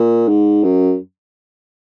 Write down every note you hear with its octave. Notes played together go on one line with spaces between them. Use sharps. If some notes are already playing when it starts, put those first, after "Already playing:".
Already playing: A#2
G#2
F#2